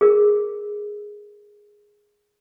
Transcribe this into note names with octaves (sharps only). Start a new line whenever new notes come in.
G#4 A#4